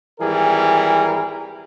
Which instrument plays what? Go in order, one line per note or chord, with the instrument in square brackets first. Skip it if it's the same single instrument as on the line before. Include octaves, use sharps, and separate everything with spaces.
[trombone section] G#1 E3 G3 G#4 A#4